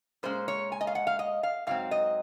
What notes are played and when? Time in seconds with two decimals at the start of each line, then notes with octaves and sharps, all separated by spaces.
0.23 A#2 G#3 C#4 C5
0.48 C#5
0.72 G#5
0.81 D#5
0.87 F5
0.95 F#5
1.07 F5
1.19 D#5
1.43 F5
1.67 G#2 F#3 C4 F5
1.91 D#5